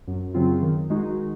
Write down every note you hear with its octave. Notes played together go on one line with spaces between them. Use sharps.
F#2
C#3 F#3 C4 F4
D#3
G#3 D#4 F#4